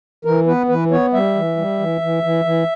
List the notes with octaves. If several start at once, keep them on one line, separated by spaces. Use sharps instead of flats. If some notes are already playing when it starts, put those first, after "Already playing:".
E3 A#4
B3 B4
E3 B4
B3 C#5
G3 E5
E3
G3
E3
E3
E3
E3